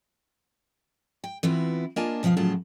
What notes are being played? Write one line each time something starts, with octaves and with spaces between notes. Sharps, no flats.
G5
E3 B3 C4 E4 F4
A#3 D4 F4 D#5 G#5 A5
B2 F3 C4 D5 F5
A2 C#3 F3 F#3 F4 A5